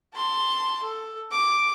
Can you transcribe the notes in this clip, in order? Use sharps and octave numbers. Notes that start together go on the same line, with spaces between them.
A5 C6
A4
D6